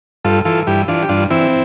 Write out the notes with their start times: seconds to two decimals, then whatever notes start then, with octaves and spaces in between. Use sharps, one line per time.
0.25 G2 F4 A4
0.45 E3 F4 A4
0.67 G2 E4 G4
0.88 E3 D4 F4
1.02 G4
1.09 G2 D4 F4
1.30 E3 C4 E4